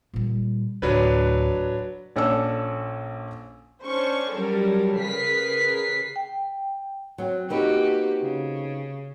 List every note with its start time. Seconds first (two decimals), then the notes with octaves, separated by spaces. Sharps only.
0.13 A#2 G3
0.82 D2 A2 F#3 D4 B4
1.55 A2
2.16 A#1 C#4 A4 D5 E6
3.86 C#4 D4 C5 C#6
4.33 F#3 G3 C#4 A4 A#4
4.99 C#3 G#4 A#4 B4 B6 C7
6.16 G5
7.18 F#3 C4
7.50 A#3 C4 D#4 F#4 G4 B4
8.22 C#3